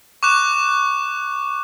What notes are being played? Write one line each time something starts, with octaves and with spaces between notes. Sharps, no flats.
C#6 D6 F#6 E7